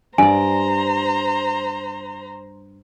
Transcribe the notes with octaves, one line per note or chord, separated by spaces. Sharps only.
G2 C5 D5 G#5 A#5